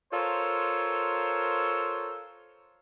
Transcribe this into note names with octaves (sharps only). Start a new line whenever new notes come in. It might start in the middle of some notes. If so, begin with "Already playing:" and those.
F4 A4 A#4 C5 C#5